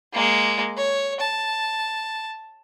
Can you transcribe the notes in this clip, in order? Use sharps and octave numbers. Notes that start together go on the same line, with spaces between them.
G#3 A#3
C#5
A5